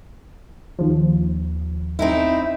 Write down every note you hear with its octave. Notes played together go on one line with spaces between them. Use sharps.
D#2 F3
C4 D#4 E4